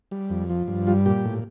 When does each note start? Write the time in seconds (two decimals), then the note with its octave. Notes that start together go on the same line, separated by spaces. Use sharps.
0.11 G3
0.30 F2
0.50 F3
0.68 G2
0.87 G3 F4
1.06 A#2 G4
1.25 A2